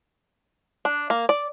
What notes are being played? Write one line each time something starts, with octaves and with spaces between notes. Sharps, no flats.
D4
A#3
D5